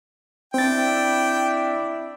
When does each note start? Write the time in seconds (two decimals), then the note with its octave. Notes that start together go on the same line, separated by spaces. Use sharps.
0.54 C4 D4 E4 G5 A6